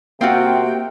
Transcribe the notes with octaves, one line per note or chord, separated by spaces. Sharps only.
C3 A#3 C4 F4 F#4 G5